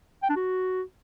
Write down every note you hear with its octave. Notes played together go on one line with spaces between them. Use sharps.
G5
D4
F#4